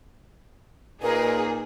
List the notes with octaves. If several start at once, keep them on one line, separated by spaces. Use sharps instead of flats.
A#2 D#4 G#4 A#4 B4